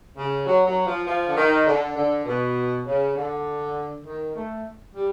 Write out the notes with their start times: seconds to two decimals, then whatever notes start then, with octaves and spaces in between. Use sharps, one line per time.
0.16 C#3
0.46 F#3
0.66 F#3
0.86 F3
1.06 F3
1.27 D3
1.36 D#3
1.66 D3
1.96 D3
2.25 B2
2.85 C#3
3.15 D3
4.05 D#3
4.35 A3
4.94 G3